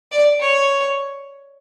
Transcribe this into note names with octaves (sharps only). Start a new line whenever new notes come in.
D5
C#5